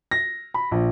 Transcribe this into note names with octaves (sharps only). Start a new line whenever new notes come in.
A#6
B5
A#1